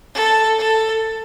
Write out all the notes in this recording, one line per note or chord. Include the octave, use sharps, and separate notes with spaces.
A4
A4